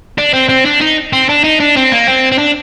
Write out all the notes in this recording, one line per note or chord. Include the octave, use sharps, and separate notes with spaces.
D4
C4
C4
D4
D#4
C4
D4
D#4
D4
C4
A#3
C4
C4
D4